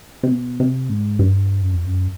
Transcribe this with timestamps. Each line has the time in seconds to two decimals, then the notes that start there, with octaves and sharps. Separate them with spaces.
0.23 C3
0.31 B2
0.60 C3
0.89 G#2
1.19 G2
1.62 F#2
1.74 F2
1.85 F#2